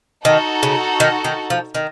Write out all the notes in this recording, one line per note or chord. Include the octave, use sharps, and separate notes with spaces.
D#3 D#4 F#4 A4
C#3
D#3
D#3
F3
D#3